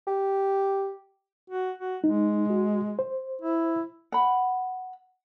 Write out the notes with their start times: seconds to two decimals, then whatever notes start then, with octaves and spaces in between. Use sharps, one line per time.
0.07 G4
1.50 F#4
1.78 F#4
2.04 G#3 D#4
2.50 F#4
2.99 C5
3.41 E4
4.12 F#5 B5